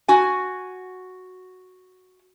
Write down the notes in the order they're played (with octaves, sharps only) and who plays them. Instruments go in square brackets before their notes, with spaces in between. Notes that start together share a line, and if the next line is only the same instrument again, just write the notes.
[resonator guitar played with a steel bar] F#4 G#5